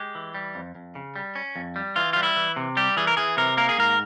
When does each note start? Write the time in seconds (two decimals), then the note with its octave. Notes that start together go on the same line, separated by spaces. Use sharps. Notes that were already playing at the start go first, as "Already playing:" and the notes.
Already playing: G#3 G4
0.15 E3
0.35 G3
0.55 F2
0.75 F2
0.95 C#3
1.16 G3
1.36 C#4
1.56 F2
1.76 G3
1.96 E3 F4
2.13 G3 F4
2.23 E4
2.37 E3
2.56 C3
2.77 G3 G4
2.97 E3 G#4
3.07 A#4
3.17 E3 G#4
3.37 C3 A#4
3.57 A#3 A#4
3.69 G#4
3.78 G#2 A#4